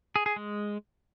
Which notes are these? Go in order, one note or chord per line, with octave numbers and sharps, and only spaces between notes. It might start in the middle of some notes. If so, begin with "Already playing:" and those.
G#4
G#4
G#3